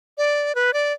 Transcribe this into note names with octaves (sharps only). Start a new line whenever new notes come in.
D5
B4
D5